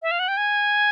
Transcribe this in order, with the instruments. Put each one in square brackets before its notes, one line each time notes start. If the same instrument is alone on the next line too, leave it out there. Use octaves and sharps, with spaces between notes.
[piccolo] E5
F5
F#5
G5
G#5